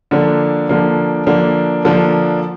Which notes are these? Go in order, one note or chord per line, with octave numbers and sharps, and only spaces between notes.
D3 F3 A#3 D4
D3 F3 A#3 D4
D3 F3 A#3 D4
D3 F3 A#3 D4